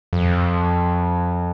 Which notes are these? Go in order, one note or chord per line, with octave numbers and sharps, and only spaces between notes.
F2